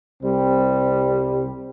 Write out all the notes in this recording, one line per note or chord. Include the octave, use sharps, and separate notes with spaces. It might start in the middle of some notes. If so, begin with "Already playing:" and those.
C2 C3 G3 C4